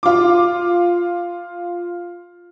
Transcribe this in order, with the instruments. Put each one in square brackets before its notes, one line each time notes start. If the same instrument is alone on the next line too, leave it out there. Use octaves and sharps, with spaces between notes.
[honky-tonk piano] F4 D6